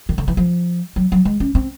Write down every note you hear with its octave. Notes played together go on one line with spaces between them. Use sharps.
D#3
D3
E3
F3
F#3
F#3
G#3
C#4
C4